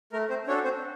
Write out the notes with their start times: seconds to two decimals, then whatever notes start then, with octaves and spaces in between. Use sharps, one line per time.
0.13 A3 A#4
0.29 C4 C5
0.47 C#4 D4 F#4 A4 C#5
0.64 C4 C5